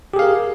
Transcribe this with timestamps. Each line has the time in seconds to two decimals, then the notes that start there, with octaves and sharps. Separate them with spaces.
0.14 G4
0.16 G#4
0.19 F5
0.22 A#4